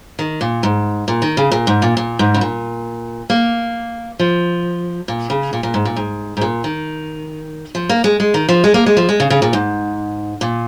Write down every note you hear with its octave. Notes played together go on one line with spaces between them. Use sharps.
D#3
A#2
G#2
A#2
D#3
C#3
A#2
G#2
A#2
A#2
G#2
C#3
A#2
A#3
F3
A#2
C#3
A#2
A#2
G#2
A#2
G#2
G#2
A#2
D#3
F3
A#3
G#3
G#3
D#3
F3
G#3
A#3
G#3
F3
G#3
C#3
C#3
A#2
G#2
A#2